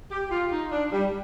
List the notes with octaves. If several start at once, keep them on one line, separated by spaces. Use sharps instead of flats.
G4
F4
D#4
D4
G3